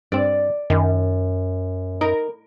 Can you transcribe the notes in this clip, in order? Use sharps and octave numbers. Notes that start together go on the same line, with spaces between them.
G2 C4 D5
F#2 D#3
D#4 A#4